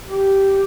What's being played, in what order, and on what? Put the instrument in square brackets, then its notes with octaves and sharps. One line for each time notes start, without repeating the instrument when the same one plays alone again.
[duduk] G4